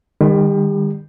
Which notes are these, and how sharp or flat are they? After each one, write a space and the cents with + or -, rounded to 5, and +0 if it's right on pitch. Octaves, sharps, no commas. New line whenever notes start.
D#3 -20 G3 +35 G4 +30